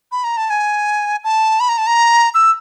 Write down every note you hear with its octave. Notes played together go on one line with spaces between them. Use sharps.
B5
A#5
A5
G#5
A5
B5
A#5
A5
A#5
E6